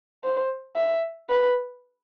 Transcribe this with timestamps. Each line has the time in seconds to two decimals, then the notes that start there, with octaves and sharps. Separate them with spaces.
0.24 C5
0.77 E5
1.30 B4